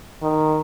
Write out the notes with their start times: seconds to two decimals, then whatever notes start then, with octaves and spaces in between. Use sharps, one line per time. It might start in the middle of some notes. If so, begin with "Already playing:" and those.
0.22 D#3